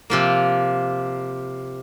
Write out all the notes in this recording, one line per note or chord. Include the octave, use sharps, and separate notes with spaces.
C3 F3 A#3